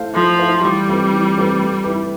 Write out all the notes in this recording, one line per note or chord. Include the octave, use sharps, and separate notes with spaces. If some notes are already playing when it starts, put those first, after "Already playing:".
Already playing: A3 E4 A4 C5 F5
F3 A3
E4 A4 C5 F5
E3 G3
A3 C4 F4 B4
E3
A3 C4 F4 B4
A3
E4 G4 B4